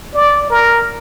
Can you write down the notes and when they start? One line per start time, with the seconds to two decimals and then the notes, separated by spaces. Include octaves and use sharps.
0.15 D5
0.50 A#4